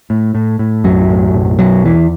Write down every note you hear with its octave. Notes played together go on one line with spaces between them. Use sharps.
A2
A2
A2
B1 F#2 F#3
A2
B1
F#2 B2 F#3
E2 E3